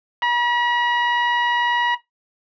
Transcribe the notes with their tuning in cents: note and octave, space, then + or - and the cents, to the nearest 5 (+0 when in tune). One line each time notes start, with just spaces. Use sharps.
B5 -45